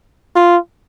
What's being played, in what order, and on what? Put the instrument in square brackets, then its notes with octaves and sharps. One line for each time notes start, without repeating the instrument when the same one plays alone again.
[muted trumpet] F4